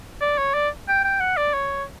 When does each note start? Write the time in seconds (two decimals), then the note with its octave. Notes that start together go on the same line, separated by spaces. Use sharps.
0.21 D5
0.38 C#5
0.54 D5
0.88 G5
1.04 G5
1.20 F#5
1.37 D5
1.54 C#5